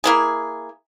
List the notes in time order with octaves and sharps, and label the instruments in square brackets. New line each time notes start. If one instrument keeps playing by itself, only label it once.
[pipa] A#3 E4 G#4